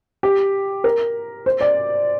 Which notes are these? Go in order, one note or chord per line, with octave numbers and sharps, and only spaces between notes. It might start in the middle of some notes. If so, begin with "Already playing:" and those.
G4
A#4
C5
D5